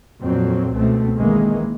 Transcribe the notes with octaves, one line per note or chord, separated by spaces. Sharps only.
F2 A#2 F#3 C4
C#2 B2 A3 C4
A1 D#3 E3 G#3 A#3